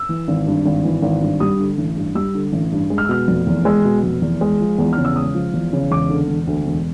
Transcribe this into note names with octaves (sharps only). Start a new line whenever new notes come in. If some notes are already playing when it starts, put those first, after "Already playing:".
Already playing: E6
E3
G#1
G2
G#1
E3
G#1
G2
G3 D#6
D3
A1
G2
G3 E6
D3
A1
G2
G#3
F6
E6
B2 F6
F1
E2
G#3 E6
B2
F1
E2
G#3
F3
E2
C#3 F6
E6
G#3 D#6
F3
E2
C#3
E1 D6
D3
E1
D2
E1